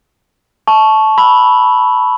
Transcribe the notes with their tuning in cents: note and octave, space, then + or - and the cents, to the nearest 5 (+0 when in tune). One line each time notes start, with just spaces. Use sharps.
A5 -15 C#6 +0
B5 +0 E6 +0